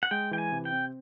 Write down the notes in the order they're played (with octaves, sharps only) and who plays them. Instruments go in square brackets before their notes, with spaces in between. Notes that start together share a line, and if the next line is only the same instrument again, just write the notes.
[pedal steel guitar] F#5
[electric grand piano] G#3 [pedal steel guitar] G5
[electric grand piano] E3 [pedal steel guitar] G5
[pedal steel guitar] G#5
[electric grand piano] C3
[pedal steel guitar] G5
[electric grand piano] C4